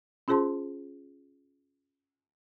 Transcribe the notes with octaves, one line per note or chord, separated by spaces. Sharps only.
C#4 F4 G#4 C5 A5 C6